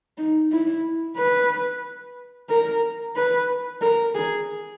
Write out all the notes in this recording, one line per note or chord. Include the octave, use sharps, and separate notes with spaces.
D#4
E4
B4
A#4
B4
A#4
G#4